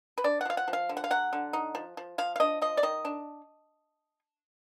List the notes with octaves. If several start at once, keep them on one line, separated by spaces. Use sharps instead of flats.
B4
D4 D5
F#5
F3 F5
F#5
F3
F5
D3
F#5
F5
F#3 F#5
D3
D#4
F3
F3
F3 F5
F5
D4 D#5
F3 D#5
D5
D#3 D#5
D4